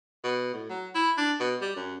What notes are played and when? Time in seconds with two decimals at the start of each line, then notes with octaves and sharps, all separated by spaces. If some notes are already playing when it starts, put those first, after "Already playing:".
0.24 B2
0.54 A2
0.70 F#3
0.95 E4
1.17 D4
1.40 B2
1.61 G3
1.76 F#2